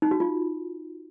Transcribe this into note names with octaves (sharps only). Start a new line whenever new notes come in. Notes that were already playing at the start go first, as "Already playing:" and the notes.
D#4
F#4
F4